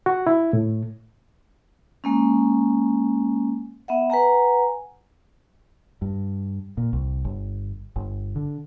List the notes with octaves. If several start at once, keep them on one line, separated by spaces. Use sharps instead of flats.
F#4
E4
A2
G#3 A#3 C#4
B3 E5 F#5
B4 F#5 G#5 A#5
G2
A#2
C2
G1
G1
D3